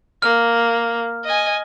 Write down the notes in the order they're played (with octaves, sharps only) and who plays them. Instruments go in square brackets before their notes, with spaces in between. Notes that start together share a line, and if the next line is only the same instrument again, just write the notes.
[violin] A#3 [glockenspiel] F6
[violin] D#5 G#5